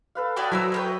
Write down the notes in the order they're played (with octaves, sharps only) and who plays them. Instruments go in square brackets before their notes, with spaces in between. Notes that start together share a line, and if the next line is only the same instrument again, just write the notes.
[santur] A4 B4 F5
[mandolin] E4 D5 G5 [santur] F#4 A5 D#6
[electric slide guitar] F#3 [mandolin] E4 D6 E6 [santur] C5 A#5
[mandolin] G4 A#4 B4 [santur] C#5 E5